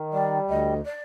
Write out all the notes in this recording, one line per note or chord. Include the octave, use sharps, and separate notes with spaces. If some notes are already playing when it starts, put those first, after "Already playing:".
Already playing: D#3
G3 D5
D2 D#5
D5